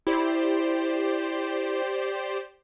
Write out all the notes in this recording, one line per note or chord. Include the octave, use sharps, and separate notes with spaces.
E4 G4 C5 D5